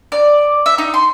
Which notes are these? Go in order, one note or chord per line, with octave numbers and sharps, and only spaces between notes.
D5
E5
D#4
C6